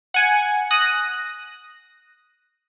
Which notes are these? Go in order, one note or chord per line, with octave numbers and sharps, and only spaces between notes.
F#5 G#5 C#7
D#6 F#6 A#6 D#7